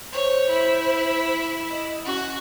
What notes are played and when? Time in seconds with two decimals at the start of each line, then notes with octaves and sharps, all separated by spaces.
0.13 C5 C#5
0.50 E4
1.70 D#5
2.05 C#4 F#4